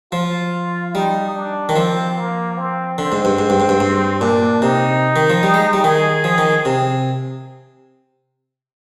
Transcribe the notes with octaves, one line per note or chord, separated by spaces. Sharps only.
F3 F4
G3 D#4
D4
D#3
F3 C4
A#3
C4
D3 C4
G#2
G2
G#2
G2
G#2
G2
G2
A#2 D4
C3 D#4
D#3
F3
G3
G#3
G3
D#3 G#4
F3
D#3
C3